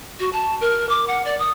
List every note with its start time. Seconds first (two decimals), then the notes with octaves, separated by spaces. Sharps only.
0.19 F#4
0.33 A5
0.61 A#4
0.89 D6
1.07 F#5
1.25 D5
1.39 D#6